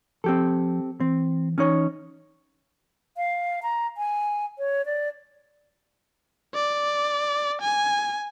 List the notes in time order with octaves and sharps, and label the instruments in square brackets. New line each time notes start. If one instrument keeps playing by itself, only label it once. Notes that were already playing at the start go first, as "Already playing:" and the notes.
[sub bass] F3 [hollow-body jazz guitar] C4 G4 A4
[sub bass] E3 [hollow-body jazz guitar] C4
[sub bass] E3 [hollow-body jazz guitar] C#4 D#4 C#5
[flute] F5
A#5
G#5
C#5
D5
[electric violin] D5
G#5